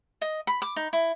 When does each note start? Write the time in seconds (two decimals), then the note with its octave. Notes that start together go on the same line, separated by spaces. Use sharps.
0.21 D#5
0.47 B5
0.62 D6
0.76 D#4
0.93 E4